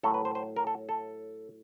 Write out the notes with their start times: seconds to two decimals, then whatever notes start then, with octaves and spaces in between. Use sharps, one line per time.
0.03 A2 F#3 A3 A4
0.14 B4
0.25 C5
0.35 C5
0.56 A#4
0.67 A4
0.89 A4